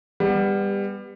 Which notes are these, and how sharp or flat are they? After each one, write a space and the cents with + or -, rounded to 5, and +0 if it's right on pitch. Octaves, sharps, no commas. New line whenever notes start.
G3 +25 B3 +0 F#5 +25